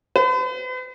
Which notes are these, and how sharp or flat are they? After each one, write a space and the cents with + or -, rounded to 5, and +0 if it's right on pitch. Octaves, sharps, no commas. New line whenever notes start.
B4 +45